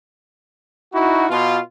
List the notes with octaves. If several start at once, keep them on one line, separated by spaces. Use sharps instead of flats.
D#4 E4 F#4
B2 F4